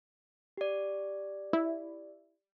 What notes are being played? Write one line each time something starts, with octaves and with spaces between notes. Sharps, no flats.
G4 D5
E4